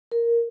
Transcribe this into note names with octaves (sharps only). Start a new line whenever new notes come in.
A#4